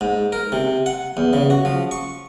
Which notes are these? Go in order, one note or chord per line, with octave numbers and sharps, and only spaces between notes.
G#2
A#4
C3
F#5
E2
C#3
F#4
F3
C#6